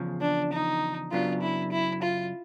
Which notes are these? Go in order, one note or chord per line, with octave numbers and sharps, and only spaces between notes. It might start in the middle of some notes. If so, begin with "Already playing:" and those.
Already playing: E2 C#3 F3
D4
D#4
F#2 C#3 F#3 B3 D4 F4
E4
E4
F4